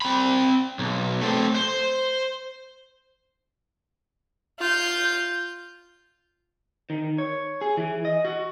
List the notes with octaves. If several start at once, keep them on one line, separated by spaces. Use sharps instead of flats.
C4 B5
B1
A3 C4
C5
F4 G6
D#3
C#5
G#4
E3
D#5
F#4